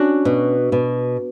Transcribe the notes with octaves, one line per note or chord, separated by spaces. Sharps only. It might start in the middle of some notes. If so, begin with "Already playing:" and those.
Already playing: C#4 D4 F#4
B2
B2